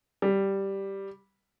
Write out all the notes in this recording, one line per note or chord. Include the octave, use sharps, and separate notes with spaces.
G3